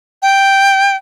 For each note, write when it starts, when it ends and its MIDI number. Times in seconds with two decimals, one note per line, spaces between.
0.22 0.96 79